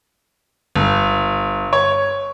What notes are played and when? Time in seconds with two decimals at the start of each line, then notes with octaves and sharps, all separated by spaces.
0.76 G1
1.73 C#5